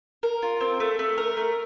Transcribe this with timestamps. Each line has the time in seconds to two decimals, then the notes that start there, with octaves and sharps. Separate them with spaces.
0.23 A#4
0.42 F4
0.61 C4
0.80 A3
0.99 A3
1.18 A#4
1.37 A3